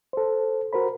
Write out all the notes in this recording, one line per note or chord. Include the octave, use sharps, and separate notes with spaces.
A4 C5
F#4 A#4 C5 B5